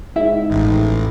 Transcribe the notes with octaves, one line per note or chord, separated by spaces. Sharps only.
G#2 E4 E5
A1